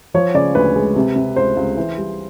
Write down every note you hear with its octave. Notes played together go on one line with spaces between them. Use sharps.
F3 C#5
C#3 D5
D2 B4
G#3
C3
C3
C#2 C5
C#2
E3
G3